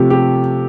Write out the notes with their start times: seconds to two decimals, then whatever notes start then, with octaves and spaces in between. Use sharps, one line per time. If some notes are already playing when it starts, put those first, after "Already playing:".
Already playing: C3 F3 A3 G4
0.10 G4